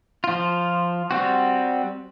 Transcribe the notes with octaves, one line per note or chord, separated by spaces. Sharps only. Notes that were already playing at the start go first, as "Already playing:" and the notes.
F3 F4
G3 C4 F#4